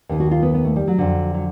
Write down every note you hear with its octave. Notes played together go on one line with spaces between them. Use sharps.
D#2 D#3
F#4
F4
B3
B3
A3
G3
F#3
F2 D3
F#3